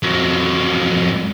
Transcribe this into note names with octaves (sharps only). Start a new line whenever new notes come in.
F2 F#3